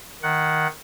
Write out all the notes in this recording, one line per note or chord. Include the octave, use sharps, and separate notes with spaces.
D#3 F#5